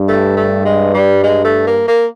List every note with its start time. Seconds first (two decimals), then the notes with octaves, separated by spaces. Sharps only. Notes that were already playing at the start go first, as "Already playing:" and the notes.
Already playing: G2
0.08 A3
0.37 A3
0.65 G#3
0.94 G3
1.23 G#3
1.44 A3
1.67 A#3
1.88 A#3